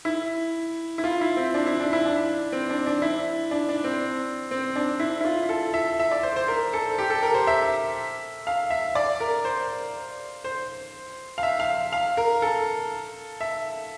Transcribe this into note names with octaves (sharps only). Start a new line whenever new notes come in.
E4
E4
F4
E4
C4
D4
E4
D4
E4
D4
C4
D4
D4
E4
D4
D4
C4
C4
D4
E4
E4
F4
A4
E5
E5
D5
C5
C5
A#4
A4
G4
A4
A#4
C5
E5
F5
E5
D5
A#4
C5
C5
F5
E5
F5
F5
A#4
A4
E5